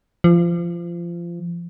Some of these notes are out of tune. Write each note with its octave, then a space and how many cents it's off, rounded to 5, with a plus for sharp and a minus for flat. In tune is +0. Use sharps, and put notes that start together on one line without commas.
F3 -25